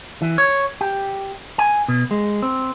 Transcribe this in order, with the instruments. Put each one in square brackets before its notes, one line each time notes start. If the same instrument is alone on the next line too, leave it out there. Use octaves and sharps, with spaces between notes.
[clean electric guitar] E3
C#5
G4
G#5
B2
G#3
C4